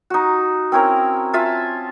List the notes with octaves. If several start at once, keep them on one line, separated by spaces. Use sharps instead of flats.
D#4 F#4
C4 C#4 E4 A#4
F4 E5 G#5 A5